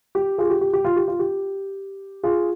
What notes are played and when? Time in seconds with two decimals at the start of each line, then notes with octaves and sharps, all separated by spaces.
0.15 G4
0.38 F4 G#4
0.50 G4
0.61 G4
0.73 G4
0.85 F4
0.96 G4
1.08 F4
1.19 G4
2.23 F4 G#4